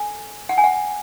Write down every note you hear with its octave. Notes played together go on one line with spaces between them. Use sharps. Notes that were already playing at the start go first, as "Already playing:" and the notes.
Already playing: A4 G#5
F#5
G#5
F#5